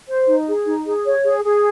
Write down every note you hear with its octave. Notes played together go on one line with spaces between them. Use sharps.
C5
D#4
G#4
D#4
G#4
C#5
G#4
G#4